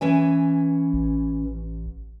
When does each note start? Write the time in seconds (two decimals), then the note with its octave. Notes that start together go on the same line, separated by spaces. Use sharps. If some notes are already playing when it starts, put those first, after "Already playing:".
0.01 E3 C#4 G#5
0.93 A1